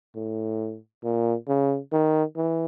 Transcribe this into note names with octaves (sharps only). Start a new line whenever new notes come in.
A2
A#2
C#3
D#3
E3